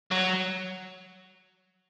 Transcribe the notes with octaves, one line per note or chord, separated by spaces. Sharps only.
F#3